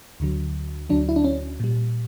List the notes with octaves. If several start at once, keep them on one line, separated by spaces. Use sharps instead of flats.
D2 D3 F#3
D2 D3 F#3 D4
E4
D4
C#4
A#2 G3